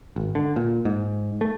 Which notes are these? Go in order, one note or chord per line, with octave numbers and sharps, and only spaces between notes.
G#1
D3
A#2
G#2
A3